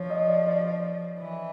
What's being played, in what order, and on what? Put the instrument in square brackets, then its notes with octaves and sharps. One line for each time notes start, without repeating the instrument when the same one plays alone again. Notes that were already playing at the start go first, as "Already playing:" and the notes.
Already playing: [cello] F3 [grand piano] C#5
[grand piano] D#5
D5
D5
[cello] E3